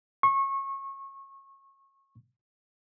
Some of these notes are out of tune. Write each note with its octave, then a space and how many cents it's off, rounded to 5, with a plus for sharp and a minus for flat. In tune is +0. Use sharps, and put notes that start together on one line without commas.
C#6 -25